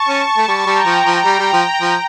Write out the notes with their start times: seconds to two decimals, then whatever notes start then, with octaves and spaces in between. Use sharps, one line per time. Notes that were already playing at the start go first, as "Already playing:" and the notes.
Already playing: A5 C#6
0.09 C#4
0.37 A3
0.48 G3
0.66 G3 G5 A#5
0.86 F3
1.05 F3
1.25 G3
1.39 G3
1.53 F3
1.82 F3